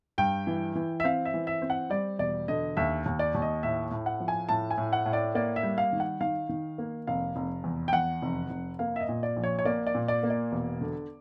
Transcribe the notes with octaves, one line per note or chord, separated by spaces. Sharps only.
G2 G5
E3
E3
E5
C4 F5
E5
E3
E5
C4
F#5
G3 D5
E1 D5
D3 D#5
D#2 E5
D#2
D5
D#2
D#5
A2 E5
A2
F#5
F3
G#5
A2 A5
G#5
A2
F#5
A2
D5
A#3 D5
E5
G3
F5
D#3
F#5
D#3 F5
D#3
A#3
F1 F5
F1
E2
G5
E2 F#5
F1
F1
A#3 F5
E5
D#5
A#2
D5
A#1
C#5
C#5
A#3 D5
D5
A#2
D5
A#3
D5
E1
D3